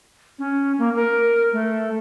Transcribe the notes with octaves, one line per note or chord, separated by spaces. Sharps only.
C#4
A#3
A#4
A3